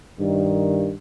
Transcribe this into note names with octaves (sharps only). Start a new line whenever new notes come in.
G2 D#3